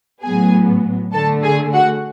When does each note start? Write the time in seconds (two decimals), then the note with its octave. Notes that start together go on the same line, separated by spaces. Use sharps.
0.22 A2 F#3 B3 G#4 G#5
1.12 D3 A3 A4 A5
1.43 G#4 G#5
1.73 F#4 F#5